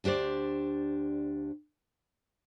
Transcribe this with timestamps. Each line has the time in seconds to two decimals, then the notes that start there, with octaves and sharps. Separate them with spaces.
0.04 D2 D4 G4 C5 D5